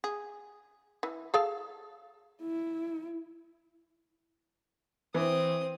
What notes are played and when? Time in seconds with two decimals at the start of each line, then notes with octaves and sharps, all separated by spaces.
0.04 G#4
1.03 E3
1.34 G#4 A4 F5
2.41 E4
5.14 E3 C4 D#6